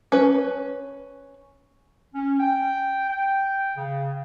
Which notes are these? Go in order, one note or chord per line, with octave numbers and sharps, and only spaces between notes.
C#4 B4
C#4
G5
G5
C#3